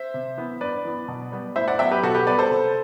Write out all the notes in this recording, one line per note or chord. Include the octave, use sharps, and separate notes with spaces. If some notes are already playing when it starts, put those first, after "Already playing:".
Already playing: C5 E5
C3
E3 B3
G2 B4 D5
E3 B3
B2
G3 B3
A2 C5 E5
D5 F#5
F#3 B3 E5 G5
G4 B4
B2 F#4 A4
G4 B4
G3 B3 B4 D5
A4 C5
C3